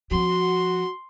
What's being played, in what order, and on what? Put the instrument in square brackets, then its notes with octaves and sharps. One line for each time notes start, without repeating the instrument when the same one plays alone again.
[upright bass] F3 C4 [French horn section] F#4 [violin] C6